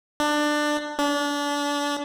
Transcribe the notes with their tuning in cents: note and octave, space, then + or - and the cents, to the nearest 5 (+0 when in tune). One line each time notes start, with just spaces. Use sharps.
D4 +20
D4 -30